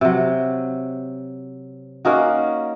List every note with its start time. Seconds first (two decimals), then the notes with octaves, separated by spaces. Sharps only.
0.01 C3 F#3
2.05 A#3 C#4 D#4 F#4